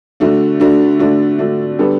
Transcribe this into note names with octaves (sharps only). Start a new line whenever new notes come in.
D3 A3 D4 F#4
D3 A3 D4 F#4
D3 A3 D4 F#4
D3 A3 D4 F#4
D3 G3 B3 D4 A4